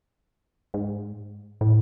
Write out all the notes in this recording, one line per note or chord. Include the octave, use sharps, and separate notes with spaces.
G#2
A2